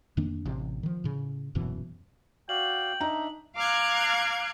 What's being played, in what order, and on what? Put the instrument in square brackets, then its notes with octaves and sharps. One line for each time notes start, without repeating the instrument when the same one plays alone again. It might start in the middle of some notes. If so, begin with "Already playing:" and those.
[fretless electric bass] F2 D#3 A#3 D4
A1 C3
D#3 F3
A2 C#3
D#1 F#2 B2 E3
[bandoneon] F#4 D5 F5 [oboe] G5 [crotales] F#7
[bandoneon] D4 E5 [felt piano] D#4 A#5
[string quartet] F5 A#5 D6 F6 F#6 G#6